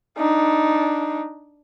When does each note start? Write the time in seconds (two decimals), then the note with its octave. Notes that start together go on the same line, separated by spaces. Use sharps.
0.17 D4 D#4